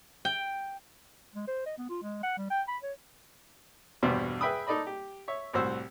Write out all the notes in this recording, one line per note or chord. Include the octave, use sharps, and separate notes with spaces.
G5
G#3
C5
D#5
B3
F4
G#3
F#5
G3
G5
B5
C#5
E2 G2 B2 G4 C5
G#4 B4 E5 G5 B5 D#6
D#4 A4 D5 D#5 B5
G4
C#5 E5
C2 A2 F#4 C5 E6